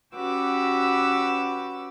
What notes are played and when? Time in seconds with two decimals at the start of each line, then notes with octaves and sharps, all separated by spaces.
0.15 C#4 F#4 G4 B4 D6 E6